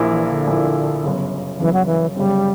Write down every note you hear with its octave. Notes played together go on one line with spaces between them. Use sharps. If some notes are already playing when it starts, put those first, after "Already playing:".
Already playing: A#1 A#2 A#3 E4
E3
D3
A#1 A#2 A#3 E4
G1 F#2 C#3
G1 F#2 C#3 E3
F#3
E3
G1 F#2 C#3 G3